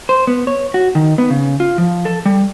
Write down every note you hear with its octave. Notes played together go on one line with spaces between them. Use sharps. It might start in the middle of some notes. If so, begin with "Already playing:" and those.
C5
B3
C#5
F#4
D#3
B3
C#3
F4
F3
A4
G3